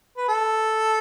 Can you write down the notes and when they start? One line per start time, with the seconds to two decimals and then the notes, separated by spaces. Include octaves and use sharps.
0.17 B4
0.28 A4